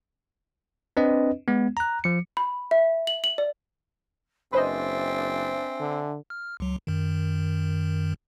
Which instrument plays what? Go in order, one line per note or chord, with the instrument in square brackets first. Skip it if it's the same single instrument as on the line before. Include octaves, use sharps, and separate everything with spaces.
[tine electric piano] C4 D4 B4 D#5
G#3 B3
A#5 F#6
F3 C#7
[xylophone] B5
E5
F#7
F#7
D5
[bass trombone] F#1 [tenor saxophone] C4 [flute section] D4 E5 G#5 [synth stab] B4 C5 D#5
[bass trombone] D3
[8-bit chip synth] F6
C#2 F#3
F#2 D#3